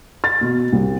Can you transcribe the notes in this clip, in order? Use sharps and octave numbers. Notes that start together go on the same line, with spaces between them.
A6
B2
C2